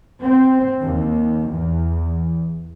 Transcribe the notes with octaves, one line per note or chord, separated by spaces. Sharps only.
C4
D#2
E2